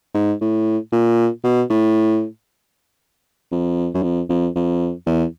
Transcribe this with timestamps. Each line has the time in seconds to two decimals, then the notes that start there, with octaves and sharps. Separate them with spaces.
0.14 G#2
0.41 A2
0.92 A#2
1.44 B2
1.70 A2
3.52 F2
3.95 F#2
4.03 F2
4.29 F2
4.55 F2
5.06 E2